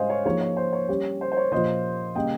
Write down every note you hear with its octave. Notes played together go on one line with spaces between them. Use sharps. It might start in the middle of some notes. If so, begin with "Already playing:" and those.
Already playing: G#2 G3 C#4 C5 D#5 F5 G#5
C#5
F3 A#3 D#4 G#4 C#5
C#5
C5
C#5
G3 C#4 G4
C5
C5
C#5
A#2 F3 A#3 F4 C5 D#5
C#3 G3 A#3 D#5 G5